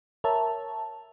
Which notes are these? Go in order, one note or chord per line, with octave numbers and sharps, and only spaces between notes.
A#4 C#5 E5 A5